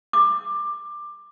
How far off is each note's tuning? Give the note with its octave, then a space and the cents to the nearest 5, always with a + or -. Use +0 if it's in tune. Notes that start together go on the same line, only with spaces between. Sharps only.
D6 +15